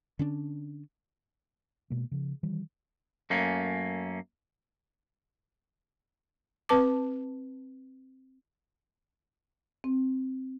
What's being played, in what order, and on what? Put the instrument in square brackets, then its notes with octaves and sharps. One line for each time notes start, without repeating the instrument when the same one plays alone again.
[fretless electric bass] D3 C#4 D4
[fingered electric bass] B2 G#3 A#3
C#3 F3
D#3 E3 G3
[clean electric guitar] F#2 A3 A#3 C#4
[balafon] C4 B4 A5 D6
[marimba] C4